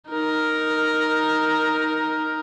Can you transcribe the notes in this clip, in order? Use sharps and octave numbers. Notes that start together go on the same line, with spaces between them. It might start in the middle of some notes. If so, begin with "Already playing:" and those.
D#4 A#4